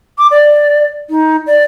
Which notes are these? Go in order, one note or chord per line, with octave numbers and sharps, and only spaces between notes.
D6
D5
D#4
D5